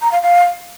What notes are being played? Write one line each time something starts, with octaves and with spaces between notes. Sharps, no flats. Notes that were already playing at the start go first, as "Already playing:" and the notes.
A#5
F5
F5